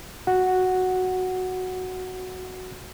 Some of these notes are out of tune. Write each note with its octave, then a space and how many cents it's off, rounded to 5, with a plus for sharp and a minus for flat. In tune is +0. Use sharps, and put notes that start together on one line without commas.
F#4 +0 F#5 +0